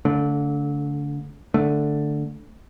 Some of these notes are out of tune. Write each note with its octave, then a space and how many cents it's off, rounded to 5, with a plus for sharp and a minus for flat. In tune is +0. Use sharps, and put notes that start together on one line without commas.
D3 -30 A3 +0
D3 +0 A3 +0